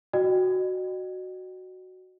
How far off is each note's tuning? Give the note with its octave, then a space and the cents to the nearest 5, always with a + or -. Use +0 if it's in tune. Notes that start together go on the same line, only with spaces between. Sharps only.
F#4 +0 D#5 -40 G5 +0